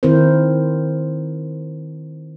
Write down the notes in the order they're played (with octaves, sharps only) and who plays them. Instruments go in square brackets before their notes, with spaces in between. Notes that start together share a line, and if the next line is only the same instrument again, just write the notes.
[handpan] D#3 C4 E4 A#4 C5